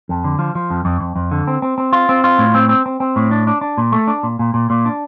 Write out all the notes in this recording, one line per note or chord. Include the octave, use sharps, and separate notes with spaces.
F2
D3
F3
F3
F2
F2
F2
F2
D3
C4
C4
C4
F4
C4
F4
A2
C4
C4
C4
C4
A2
D4
D4
D4
A#2
A3
D4
A#2
A#2
A#2
A#2
D4